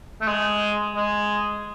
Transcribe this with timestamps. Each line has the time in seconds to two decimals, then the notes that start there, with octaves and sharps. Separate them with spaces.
0.21 A3
0.27 G#3
0.96 G#3